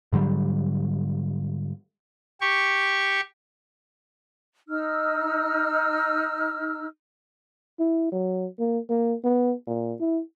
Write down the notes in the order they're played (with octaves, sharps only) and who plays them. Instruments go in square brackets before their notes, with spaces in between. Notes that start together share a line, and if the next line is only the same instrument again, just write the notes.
[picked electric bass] G#2 D3 F#3 G3
[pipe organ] G4 C#6
[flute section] D#4 E6 F6
[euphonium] E4
F#3
A#3
A#3
B3
A#2
E4